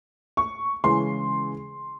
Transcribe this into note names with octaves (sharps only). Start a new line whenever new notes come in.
C#6
C#3 E3 G#3 C6